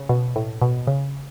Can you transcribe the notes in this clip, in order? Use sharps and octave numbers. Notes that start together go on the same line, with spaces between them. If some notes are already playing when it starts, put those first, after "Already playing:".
Already playing: C#3
B2
A2
B2
C#3